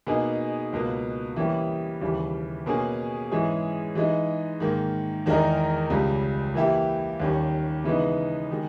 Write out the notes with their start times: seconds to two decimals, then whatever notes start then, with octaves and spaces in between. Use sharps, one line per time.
0.07 B2 A#3 D#4 G#4
0.73 C#2 B2 A#3
1.36 E3 G3 A#3 C#4 G4
2.01 D#2 C#3 E3 G3
2.66 B2 A#3 C#4 G#4
3.32 G#2 E3 G#3 C#4 G#4
3.95 E3 G#3 D#4
4.60 G#2 D#3 A#3
5.26 E2 D#3 G#3 D#4 A#4
5.90 C#2 C#3 G3
6.55 E3 A#3 E4 G4
7.20 D#2 D#3 G3 C#4
7.84 C#3 E3 G#3 B3 D#4
8.51 D#3 G#3